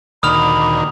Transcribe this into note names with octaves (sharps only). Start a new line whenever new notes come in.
D2 A#2 D#3 B5 D#6 F6 F7